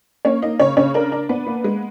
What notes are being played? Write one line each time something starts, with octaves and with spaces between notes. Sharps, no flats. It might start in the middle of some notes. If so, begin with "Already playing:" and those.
A#3 C#4 C#5
A#3 D#4 D#5
C#3 C#4 C#5
C#3 C#4 C#5
D4 A#4
D4
B3 D4 B4
A#3
G#3